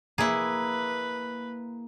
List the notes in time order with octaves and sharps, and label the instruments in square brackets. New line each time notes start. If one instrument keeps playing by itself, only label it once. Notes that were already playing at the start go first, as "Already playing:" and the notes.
[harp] A#3 [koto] E4 G#4 [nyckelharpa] B4